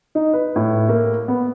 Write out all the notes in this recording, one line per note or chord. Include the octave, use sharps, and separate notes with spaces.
D#4
B4
A2
A#3
B3